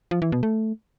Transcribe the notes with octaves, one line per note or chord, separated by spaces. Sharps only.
F3
E3
B2
A3